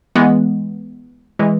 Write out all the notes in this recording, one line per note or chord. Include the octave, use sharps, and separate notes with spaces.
E3 G#3 B3
E3 G#3